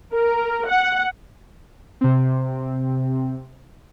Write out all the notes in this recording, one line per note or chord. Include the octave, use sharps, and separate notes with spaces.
A#4
F#5
C3 C4